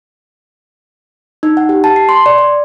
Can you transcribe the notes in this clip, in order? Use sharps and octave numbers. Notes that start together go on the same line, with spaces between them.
D#4
F#5
G4
A5
C7
C6
D5
D5